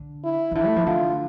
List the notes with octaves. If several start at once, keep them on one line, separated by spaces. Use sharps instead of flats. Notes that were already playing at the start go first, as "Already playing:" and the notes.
Already playing: D3
E4
E3
D3 E4
A3
F3
D3 F4